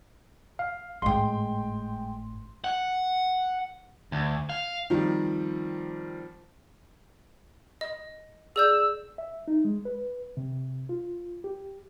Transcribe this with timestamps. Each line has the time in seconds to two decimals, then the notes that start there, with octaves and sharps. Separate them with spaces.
0.59 F5
1.02 G#1 A2 G#3 G5 C6
2.64 F#5
4.12 D2
4.50 F5
4.90 D#3 F3 G3 C4
7.81 D#5
8.56 G#4 D5 E6 G6
9.18 E5
9.48 D#4
9.65 G#3
9.85 B4
10.37 C3
10.89 F4
11.44 G4